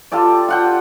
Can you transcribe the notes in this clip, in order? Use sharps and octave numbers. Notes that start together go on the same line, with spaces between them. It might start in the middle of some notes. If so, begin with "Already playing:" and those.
F4 G4 A4 D5
F4 F#5 G5